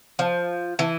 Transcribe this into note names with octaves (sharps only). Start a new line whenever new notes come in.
F3
E3